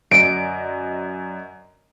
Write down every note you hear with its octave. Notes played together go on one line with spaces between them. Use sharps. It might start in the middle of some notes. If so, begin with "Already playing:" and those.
F#2 D5 D#5 D7